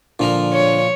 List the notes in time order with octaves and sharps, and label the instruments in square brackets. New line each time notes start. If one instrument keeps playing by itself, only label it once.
[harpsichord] A#2 F3 A#4 [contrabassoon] D3
[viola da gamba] C#5